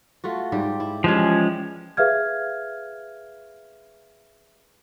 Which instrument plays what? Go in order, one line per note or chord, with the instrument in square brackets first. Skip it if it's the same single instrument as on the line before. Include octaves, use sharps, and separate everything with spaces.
[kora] A3 F4 F#4
G#2 G3 G4
E4
[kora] E3 G3 [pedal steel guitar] F3 G#3 C#4
[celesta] G#4 B4 E5 F5 F6 G#6